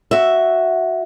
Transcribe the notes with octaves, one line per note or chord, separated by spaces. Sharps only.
F#4 E5